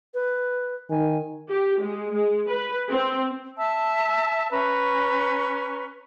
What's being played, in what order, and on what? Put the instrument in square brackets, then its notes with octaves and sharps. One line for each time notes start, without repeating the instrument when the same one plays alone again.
[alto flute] B4
[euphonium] D#3 [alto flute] G#5
[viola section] G4
G#3
G#3
B4
C4
[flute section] E5 A5 E6
C#4 B4 A#5 C#6